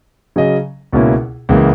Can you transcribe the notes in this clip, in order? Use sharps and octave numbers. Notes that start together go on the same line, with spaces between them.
C#3 F#3 C#4 G#4 D#5
C#2 B2 A#3 C#4 E4
C#2 C#3 E3 A#3